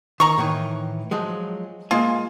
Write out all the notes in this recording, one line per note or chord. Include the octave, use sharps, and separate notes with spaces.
D#3 A#5 C#6
A2 D#3 E3
F3 F#3 G#3
G#3 A#3 F4 G#5